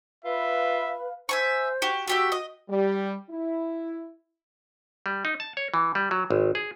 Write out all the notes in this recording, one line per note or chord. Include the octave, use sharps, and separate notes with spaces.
F4 B4 E5 F5 B5
C5 E5 G#5 C#6
F#4 G4
A3 F#4 G4 E5
D#5
G3
E4
G3
D#4
A5
C#5
E3
G3
F#3
G#1
G#4